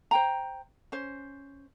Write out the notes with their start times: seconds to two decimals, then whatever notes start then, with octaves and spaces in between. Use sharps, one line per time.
0.11 C5 G5 A#5
0.92 C#4 C5